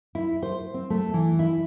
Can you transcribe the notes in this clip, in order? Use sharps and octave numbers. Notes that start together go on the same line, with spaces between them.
E4
C5
C4
A3
E3
E4